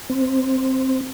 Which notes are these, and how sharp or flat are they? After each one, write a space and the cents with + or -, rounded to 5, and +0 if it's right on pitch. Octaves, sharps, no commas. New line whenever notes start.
C4 +5